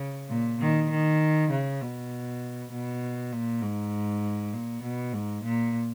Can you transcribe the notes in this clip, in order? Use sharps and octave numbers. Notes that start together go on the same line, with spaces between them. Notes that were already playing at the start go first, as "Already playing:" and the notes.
Already playing: C#3
A#2
D#3
D#3
C#3
B2
B2
A#2
G#2
A#2
B2
G#2
A#2